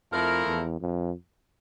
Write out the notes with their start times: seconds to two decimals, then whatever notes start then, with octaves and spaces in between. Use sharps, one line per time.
0.12 F2 F3 A3 E4 A#4
0.47 E2
0.81 F2